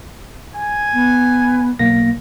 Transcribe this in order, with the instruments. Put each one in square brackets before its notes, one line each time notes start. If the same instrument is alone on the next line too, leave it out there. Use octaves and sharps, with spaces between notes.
[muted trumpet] G#5
[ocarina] B3
[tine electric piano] B1 A#3 A#6